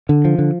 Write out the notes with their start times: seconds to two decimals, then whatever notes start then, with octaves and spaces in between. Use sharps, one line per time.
0.09 D3
0.25 F3
0.39 D3